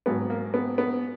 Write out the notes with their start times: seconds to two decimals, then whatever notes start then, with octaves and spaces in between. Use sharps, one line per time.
0.06 G#1 G#2 F#3 B3
0.30 A#3
0.54 B3
0.78 B3